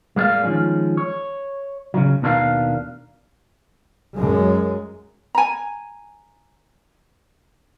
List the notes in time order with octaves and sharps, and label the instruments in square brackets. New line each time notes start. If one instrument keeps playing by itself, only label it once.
[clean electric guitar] G#3 A#3 C#4 D5 F5
D#3 F3 G#3 C#4
C#5
C#3 F#3
D#2 B2 D4 F4 A#4 F5
[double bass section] F#2 G#3
[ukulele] G#5 A#5